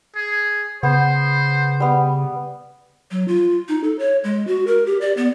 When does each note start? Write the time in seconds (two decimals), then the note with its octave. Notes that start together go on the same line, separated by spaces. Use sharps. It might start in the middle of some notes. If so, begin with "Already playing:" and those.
0.16 G#4
0.83 C#3 B3 C5
1.80 G3 B3
3.11 F#3
3.28 F4
3.68 D#4
3.84 A4
3.99 C#5
4.24 G#3
4.47 F#4
4.67 A#4
4.86 G4
5.01 D5
5.17 B3